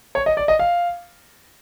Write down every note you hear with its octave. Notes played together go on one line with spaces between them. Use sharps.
C#5
D#5
D5
D#5
F5